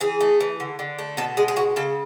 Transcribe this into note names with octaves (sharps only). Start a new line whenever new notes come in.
E3 G#4
A3
E3
D3
D3
A3
B2 A4
G#3 G#4
G#4
B2 F#4
C#3 A4